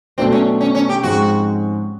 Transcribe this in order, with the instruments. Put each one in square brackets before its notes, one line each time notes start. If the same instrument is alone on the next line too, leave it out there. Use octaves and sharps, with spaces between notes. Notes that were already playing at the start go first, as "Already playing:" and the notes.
[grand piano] B2 F#3 A3 D4 [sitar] C4
[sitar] C#4
C#4
C#4
G4
[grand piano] G#2 F3 G#3 C4 [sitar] F#4